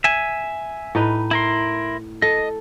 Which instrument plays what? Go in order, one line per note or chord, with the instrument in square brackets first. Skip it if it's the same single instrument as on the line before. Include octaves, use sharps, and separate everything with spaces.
[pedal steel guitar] E5 G#5
[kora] A2 D#4 B4
[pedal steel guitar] E4 A#4 C6
[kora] A4 [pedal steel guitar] D#5